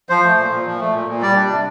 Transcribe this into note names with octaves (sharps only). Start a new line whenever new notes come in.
F3 C5
A3
A#2
A#2
F3
A3
A#2
A#2
G3 D5
D4
C3